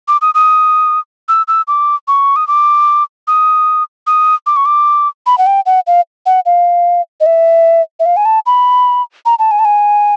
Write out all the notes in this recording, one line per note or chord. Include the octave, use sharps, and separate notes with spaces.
D6
D#6
D#6
E6
E6
D6
C#6
D#6
D6
D#6
D#6
D6
C#6
D6
B5
F#5
G5
F#5
F5
F#5
F5
D#5
E5
E5
F5
G#5
A5
B5
A#5
A5
G#5
A5
G#5